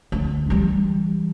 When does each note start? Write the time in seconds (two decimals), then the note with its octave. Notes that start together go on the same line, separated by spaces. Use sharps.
0.12 D2
0.50 E3 G3